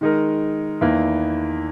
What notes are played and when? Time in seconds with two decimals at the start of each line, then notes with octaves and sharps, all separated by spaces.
0.01 D#3 G#3 D#4 A#4
0.81 E2 D#3 A#3 E4 B4